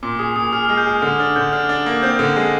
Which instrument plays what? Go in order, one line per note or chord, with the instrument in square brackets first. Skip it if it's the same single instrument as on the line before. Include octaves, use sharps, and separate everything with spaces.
[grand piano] A#2 [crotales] D6
[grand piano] G#4 [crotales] D#6
[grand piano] A#2 [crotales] D#6
[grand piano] G#4 [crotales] F6
[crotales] F6
[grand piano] G#3
[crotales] G6
[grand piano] G#4 [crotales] F6
[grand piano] D3 [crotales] F6
[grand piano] D4 [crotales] F6
[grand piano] D3 [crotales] G6
[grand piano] D4 [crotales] F6
[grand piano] D4
A#3
[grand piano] C4 [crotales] G6
[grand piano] D3
G#3